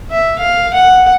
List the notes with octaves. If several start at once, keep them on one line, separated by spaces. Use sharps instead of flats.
E5
F5
F#5